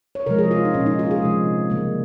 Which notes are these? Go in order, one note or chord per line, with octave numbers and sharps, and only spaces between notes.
C#5
C3 F3 G#3 A#4
G#4
F4
D#4
A#2 G#3 C#4
D#4
F4
G#4
C3 F3 G#3
C#3 G3 A#3